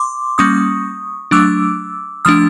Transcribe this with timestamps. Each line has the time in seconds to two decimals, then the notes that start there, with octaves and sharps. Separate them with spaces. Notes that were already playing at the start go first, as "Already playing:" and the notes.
Already playing: C6 D6
0.38 G3 A#3 C#4 C#6 D#6
1.31 F#3 A3 D4 D6 E6
2.25 F3 A3 D4 D#6 F6